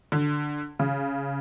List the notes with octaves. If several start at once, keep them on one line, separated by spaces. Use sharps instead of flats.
D3
C#3